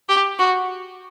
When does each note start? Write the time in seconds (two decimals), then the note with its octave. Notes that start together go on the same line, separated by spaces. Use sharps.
0.09 G4
0.39 F#4